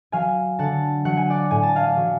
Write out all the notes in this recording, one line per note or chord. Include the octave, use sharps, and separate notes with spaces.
F#3 F5 G#5
D3 F#5 A5
F#3 F#5
G#5
D5 F#5
A2 G#5
A5
F5 G#5
F#3